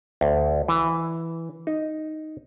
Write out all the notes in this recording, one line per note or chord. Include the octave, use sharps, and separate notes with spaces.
D2
E3
D#4